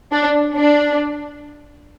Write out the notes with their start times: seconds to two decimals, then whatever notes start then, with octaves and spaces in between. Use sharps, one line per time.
0.11 D4
0.55 D4